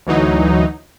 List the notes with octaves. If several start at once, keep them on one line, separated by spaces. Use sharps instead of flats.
D2 E3 F#3 D#4